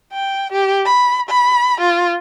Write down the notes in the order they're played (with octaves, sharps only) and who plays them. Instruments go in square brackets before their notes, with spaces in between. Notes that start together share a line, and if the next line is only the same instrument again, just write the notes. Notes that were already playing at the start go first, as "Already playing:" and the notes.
[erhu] G5
G4
B5
B5
F4